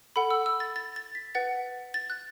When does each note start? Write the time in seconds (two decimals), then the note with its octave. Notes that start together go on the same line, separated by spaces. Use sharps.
0.16 A4 F#5 B5
0.31 E6
0.46 E6
0.60 A6
0.76 A6
0.96 A6
1.15 B6
1.35 B4 F#5 A6
1.94 A6
2.10 F#6